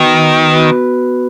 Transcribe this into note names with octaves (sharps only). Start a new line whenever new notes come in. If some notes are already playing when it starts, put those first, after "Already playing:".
Already playing: D#3 B3 F#4 B4
B3 F#4 B4